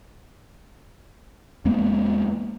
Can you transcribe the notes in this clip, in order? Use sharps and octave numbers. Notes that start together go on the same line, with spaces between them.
E2 G#3 A#3 B3